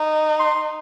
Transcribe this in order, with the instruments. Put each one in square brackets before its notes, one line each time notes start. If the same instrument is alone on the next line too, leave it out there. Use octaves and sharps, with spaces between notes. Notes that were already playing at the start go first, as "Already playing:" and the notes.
Already playing: [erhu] D#4
[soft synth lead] C6